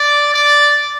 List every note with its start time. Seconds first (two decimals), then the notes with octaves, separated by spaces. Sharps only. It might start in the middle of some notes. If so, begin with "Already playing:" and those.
Already playing: D5
0.34 D5